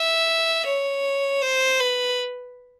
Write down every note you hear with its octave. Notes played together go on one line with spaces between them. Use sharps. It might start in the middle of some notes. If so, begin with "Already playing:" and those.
Already playing: E5
C#5
C5
B4